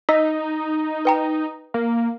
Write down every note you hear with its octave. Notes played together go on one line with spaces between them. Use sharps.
D#4 D#5 E6 B6
B4 G5 A#5
A#3